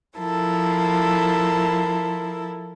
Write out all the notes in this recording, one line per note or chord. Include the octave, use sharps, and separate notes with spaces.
F3 E4 A4 A#4